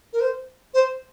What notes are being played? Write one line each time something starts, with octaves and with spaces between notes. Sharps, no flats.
A#4
C5
C5